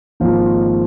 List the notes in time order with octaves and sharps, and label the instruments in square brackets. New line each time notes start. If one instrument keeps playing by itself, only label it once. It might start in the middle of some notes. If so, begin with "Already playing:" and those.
[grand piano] G#1 G#2 F3 A#3